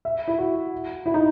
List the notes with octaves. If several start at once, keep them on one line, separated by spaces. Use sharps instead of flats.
E5
E4
F#4
E4
D#4